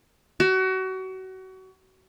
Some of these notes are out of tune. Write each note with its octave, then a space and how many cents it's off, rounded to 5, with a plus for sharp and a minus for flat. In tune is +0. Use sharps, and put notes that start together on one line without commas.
F#4 +30